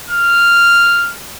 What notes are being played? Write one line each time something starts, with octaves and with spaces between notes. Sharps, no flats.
F6